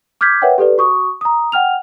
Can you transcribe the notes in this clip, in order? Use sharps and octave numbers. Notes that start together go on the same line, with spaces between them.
D6 F6 G6 G#6 B6
A#4 B4 C#5 E5 F#5 G5
G4 A4 B4 D5
F#4 C#6 D#6
A#5 D#6
F#5 G5 F6 F7